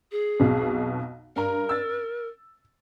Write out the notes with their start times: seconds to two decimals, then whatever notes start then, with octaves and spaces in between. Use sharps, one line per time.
0.12 G#4
0.40 B1 F2 B2
1.36 G2 A#4 A#5
1.69 E6 A6